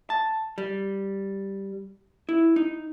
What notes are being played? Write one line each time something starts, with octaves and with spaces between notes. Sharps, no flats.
A5
G3
E4
D#4